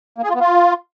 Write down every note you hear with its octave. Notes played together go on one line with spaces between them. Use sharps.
A#3
G#4
F4
B3
F4